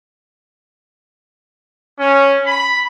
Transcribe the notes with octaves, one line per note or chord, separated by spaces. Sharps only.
C#4
B5